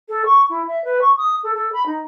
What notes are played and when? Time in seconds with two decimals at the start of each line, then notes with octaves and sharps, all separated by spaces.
0.09 A4
0.26 C#6
0.49 E4
0.68 E5
0.84 B4
1.01 C#6
1.17 D#6
1.43 A4
1.55 A4
1.73 B5
1.86 D#4